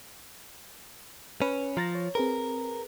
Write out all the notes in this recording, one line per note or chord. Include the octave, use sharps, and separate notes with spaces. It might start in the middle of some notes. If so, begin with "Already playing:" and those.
C#4 B4
F3 A#5 A6 A#6
C#5
C4 G#4 A#4 B4